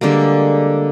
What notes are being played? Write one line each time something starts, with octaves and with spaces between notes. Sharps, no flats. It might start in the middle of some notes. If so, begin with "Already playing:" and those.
D3 G3 G#3 A#3